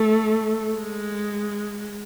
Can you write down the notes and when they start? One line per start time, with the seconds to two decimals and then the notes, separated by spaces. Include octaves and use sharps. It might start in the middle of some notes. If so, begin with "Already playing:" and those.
Already playing: A3
0.76 G#3